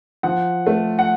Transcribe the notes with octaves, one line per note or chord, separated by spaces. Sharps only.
F3 F#5
A3
F#5